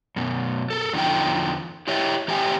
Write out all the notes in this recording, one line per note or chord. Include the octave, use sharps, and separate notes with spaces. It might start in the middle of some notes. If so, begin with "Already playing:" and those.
F#2 B2
A4 A#4
E2 D3 F3 D#4 G5
E4 G4 C#5 E5 G5
E3 G4 E5 G5 G#5